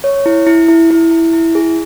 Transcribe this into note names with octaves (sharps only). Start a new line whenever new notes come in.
C#5
E4
E4
E4
E4
E4
E4
G#4